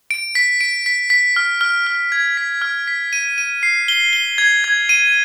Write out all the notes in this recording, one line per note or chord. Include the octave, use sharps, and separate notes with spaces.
D7
B6
D7
B6
B6
F6
F6
F6
G#6
B6
F6
B6
D#7
D#7
C7
G7
G7
G#6
G#6
D#7